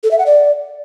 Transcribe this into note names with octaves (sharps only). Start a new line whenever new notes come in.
A4
E5
F#5
D5